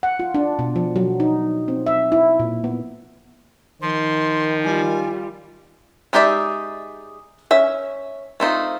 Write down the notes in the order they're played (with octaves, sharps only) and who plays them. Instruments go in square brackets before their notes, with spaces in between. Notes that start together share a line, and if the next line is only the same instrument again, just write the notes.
[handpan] F#5
F4
D4
B2
F3
F#3
D#4
C4
E5
E4
A#2
B3
[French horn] D#3 [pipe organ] F3 [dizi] C6
[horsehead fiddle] G3 F4 [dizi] G#5
[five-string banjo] G#3 D#4 G4 D5 E5
C#4 E5
A3 C4 D#4 F4